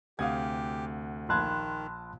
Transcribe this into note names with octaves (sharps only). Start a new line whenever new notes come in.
D2 C3 G4 F5 F#5 D#6 G#6
A#1 D#3 A5 B5 C6 F#6 G#6